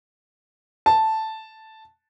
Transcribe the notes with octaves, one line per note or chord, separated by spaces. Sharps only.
A5